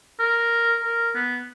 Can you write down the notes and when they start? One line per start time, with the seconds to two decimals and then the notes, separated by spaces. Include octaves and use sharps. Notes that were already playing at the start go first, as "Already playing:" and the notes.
0.20 A#4
0.84 A#4
1.15 B3